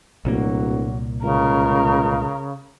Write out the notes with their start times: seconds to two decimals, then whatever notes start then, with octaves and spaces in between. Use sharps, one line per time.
0.25 D1 C2 A#2 F#3 A#3
1.23 C#2 C#3 A#4